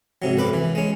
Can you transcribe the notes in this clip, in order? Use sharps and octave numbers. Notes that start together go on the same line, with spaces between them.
G#2 C3 F#3
B1 F#2 B4 B5 D6
E3
G#3 C#4